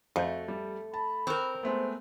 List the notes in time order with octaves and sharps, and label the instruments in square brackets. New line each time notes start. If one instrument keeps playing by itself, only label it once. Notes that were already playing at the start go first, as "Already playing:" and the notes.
[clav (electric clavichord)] F2 [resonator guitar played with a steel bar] A3 [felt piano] F#4 G6
[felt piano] G3
[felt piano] A5 [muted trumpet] B5
[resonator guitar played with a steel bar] C4 A#4 [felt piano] C#6 F#6
[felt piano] G#3 A3 B3 [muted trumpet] C5